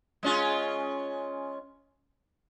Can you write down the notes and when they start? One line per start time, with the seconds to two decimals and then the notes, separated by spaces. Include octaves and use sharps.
0.23 G#3 C#4 F4